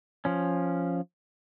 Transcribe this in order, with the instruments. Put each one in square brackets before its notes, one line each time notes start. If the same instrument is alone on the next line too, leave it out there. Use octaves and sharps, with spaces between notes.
[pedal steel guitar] F3 C#4